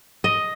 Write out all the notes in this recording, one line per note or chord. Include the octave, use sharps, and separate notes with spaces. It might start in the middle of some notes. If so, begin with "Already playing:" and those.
D#5